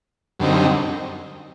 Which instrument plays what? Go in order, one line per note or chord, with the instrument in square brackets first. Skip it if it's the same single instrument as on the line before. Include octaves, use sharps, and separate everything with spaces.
[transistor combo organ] F#2 D3 G3 C4 D#4